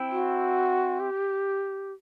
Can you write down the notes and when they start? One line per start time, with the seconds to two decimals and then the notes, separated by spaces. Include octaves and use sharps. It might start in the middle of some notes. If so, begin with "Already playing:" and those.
Already playing: C4 E4
0.11 F#4
1.00 G4